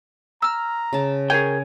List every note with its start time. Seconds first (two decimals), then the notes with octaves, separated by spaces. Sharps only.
0.42 A#5 E6 F6
0.93 C#3 A5
1.30 G#4 A#4 C#5 G5 G#5